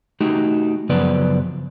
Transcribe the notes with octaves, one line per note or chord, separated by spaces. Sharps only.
A3 D#4 F#4 G4
F#2 C#3 F3 B3 B4 D5